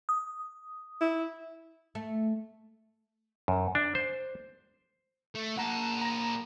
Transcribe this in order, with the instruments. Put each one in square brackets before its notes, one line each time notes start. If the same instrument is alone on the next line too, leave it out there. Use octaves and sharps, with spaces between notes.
[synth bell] D#6
[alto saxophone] E4
[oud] A3
[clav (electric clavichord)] F#2
D4
C5
[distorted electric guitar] A3
[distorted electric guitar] A#2 A5 [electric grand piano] F#5 A#5
[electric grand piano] A#5 A#6